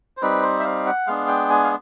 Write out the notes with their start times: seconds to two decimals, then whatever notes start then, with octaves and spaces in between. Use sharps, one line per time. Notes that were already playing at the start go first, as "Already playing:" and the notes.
0.17 C5
0.22 G3 C4 D#4 B4
0.43 C5
0.59 E5
0.64 F5
0.86 F#5
1.07 G#3 B3 D4 F5
1.28 G5
1.50 G#5
1.64 F5